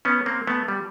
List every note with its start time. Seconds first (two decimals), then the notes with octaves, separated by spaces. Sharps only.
0.05 B3 C#4
0.26 A#3 C4
0.47 A3 B3
0.68 G3